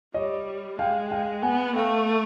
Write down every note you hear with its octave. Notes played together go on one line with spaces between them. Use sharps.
G3 C#5 D#5
G#3 F5 G5
F5 G5
B3 F#5 G#5
A3 F5 G5